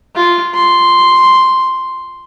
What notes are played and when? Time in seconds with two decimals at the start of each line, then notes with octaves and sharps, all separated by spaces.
0.16 F4
0.55 C6